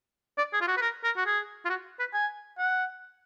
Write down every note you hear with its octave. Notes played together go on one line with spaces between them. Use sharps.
D5
G#4
F4
F#4
B4
A#4
A#4
F#4
G#4
F4
F#4
B4
G#5
F#5